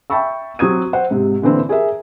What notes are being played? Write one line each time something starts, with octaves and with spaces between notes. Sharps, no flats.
E5 G5 A5 B5 C#6 E6
F#3 C4 D#6 G#6 D#7
C5 F#5
G#2 C3
A#2 D3 E3 C4
G#4 A#4 E5